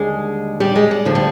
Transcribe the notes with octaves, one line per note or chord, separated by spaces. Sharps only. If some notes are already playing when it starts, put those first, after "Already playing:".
Already playing: D#2 D3 G3 G#3 G#4
G3 G4
G#3
G3
D2 D3 F3
G3